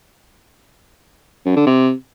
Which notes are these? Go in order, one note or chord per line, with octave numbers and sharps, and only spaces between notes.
F#2
D3
C3